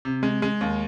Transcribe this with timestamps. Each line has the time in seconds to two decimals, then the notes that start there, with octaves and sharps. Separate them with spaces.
0.05 C3
0.23 G#3
0.42 G#3
0.61 D#2